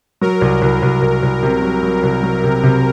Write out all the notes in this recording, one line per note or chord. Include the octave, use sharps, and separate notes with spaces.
F#3 A#4
C2
C2
C2
C2
C2
C3
F#3
F#3
C2
F#3
C3
C3